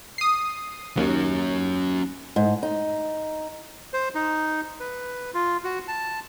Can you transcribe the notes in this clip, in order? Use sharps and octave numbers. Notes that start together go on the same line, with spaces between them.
D#6 C7
D#2 F#3 C#4
G#2
D#4
C5
D#4
B4
F4
F#4
A5